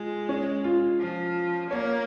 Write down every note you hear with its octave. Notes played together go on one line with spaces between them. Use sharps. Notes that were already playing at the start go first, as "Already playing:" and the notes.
Already playing: G#3 F4
C#4
F4
F3
A#3 C#5